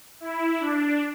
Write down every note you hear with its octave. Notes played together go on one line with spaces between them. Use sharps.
E4
D4